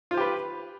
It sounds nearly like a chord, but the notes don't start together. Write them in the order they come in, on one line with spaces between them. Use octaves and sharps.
F4 C5 G4 B4